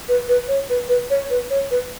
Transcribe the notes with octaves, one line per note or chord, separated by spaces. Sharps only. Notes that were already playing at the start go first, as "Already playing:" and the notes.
B4
B4
C#5
B4
B4
C#5
B4
C#5
B4